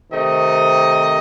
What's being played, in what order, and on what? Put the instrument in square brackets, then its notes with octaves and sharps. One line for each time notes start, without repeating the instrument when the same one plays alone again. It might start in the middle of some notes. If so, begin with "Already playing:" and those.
[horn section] C3 D#3 A3 C4 D#5